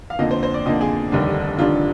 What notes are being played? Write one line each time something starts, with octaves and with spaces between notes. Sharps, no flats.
F5
F2 D3 F3 A#3 D#5
C5
C5
D5
F2 D3 F3 A#3 D#5
G#4
F1 D#2 D3 G3 D4
F1 D#2 D3 G3 D4 F4